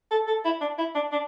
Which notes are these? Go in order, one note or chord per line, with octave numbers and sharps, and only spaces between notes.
A4
A4
E4
D4
E4
D4
D4